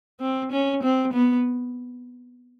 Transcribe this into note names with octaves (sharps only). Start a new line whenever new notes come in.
C4
C#4
C4
B3